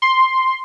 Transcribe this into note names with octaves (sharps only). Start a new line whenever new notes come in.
C6